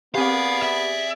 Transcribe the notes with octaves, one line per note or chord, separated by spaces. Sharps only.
B3 C4 G4 G#4 D5 F5
E5